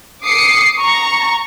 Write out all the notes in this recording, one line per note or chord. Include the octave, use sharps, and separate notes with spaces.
D6 D#6 C7 C#7
A#5 C#6